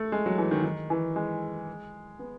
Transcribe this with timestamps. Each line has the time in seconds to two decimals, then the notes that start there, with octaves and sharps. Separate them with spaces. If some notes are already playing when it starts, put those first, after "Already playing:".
Already playing: A3
0.12 G#3
0.26 F#3
0.38 E3
0.51 D#3
0.64 D#3
0.90 E3
1.16 G#3
2.19 B3